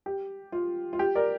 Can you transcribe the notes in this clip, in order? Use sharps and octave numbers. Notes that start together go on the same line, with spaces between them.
G4
F4
F4
G4
A#4 D5